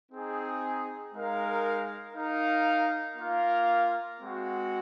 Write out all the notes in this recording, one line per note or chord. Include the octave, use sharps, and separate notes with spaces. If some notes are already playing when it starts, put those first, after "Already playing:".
C4 D#4 G#4
G#3 D#4 A#4 F5
D#4 A#4 F5
A#3 F4 A#4 F5
G#3 C4 F#4